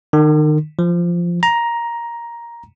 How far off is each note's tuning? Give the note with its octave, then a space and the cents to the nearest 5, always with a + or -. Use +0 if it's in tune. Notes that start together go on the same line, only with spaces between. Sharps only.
D#3 -35
F3 -10
A#5 +10